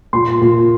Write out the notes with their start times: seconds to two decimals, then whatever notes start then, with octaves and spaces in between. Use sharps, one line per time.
0.13 A#2 C6
0.41 A#2